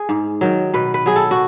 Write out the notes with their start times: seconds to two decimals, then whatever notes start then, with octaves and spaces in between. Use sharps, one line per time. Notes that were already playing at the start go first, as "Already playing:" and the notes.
Already playing: G#4
0.09 G#2
0.41 D#3 F#3
0.74 B2 B4
0.94 B4
1.06 F#3 G#4
1.16 A4
1.31 F#4